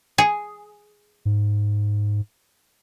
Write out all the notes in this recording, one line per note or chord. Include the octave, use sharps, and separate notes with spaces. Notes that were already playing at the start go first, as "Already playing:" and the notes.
G#4
G#2